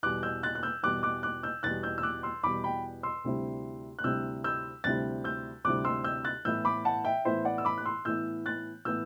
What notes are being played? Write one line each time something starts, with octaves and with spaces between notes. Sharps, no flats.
E2 B2 G3 D6 F#6
E6 G6
F#6 A6
F#6
E6 G6
E2 B2 G3 D6 F#6
D6 F#6
D6 F#6
E6 G6
E2 B2 G3 F#6 A6
E6 G6
E6
D6 F#6
C6 E6
E2 B2 G3 B5 D6
G5 B5
C6 E6
D2 C3 G3 C4 E4
F#6
D2 C3 G3 C4 E4 E6 G6
E6 G6
D2 C3 G3 C4 E4 F#6 A6
E6 G6
D2 C3 G3 C4 E4 D6 F#6
C6 E6
E6 G6
F#6 A6
A2 E3 B3 E4 E6 G6
B5 D6
F#5 A5
E5 G5
A2 E3 B3 E4 C5 E5
D5 F#5
E6
B5 D6
F#6
C6 E6
A2 E3 B3 E4 E6 G6
F#6 A6
A2 E3 B3 E4 E6 G6